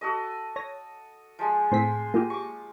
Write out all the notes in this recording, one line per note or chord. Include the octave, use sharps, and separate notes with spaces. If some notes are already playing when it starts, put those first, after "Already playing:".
F#4 A4 D#5
C#5 A#6
F3 G#3
A2 C4 C6 B6
A#3 F4 G4 D#5
C#6 D6